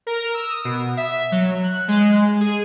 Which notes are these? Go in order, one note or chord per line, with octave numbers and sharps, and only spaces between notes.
A#4
E6
D#6
B2
E5
F#3
F#6
G#3
G#4